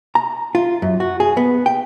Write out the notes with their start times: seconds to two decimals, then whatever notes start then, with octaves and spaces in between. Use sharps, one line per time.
0.15 A#5
0.55 F4
0.82 F#2
1.00 F#4
1.20 G#4
1.37 B3
1.66 G5